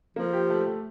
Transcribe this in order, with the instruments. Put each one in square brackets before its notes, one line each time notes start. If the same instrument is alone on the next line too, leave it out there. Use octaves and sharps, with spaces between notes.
[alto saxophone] F3 [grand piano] A#3
[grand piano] G4
A3
A3